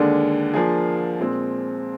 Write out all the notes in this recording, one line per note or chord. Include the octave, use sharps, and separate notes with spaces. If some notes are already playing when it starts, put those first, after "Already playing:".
Already playing: D#2 D3 G#3 D4
F3 A#3 D4 G#4
A#2 G#3 C4